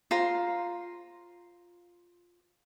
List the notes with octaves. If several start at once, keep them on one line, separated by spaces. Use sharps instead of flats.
F4 C5 A#5 C6